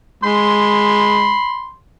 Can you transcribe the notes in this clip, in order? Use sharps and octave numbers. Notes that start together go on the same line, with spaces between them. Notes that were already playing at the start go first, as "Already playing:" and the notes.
G#3 B5 C6